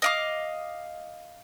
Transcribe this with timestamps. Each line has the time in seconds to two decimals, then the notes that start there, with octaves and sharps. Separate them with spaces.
0.02 D#5 F5 D6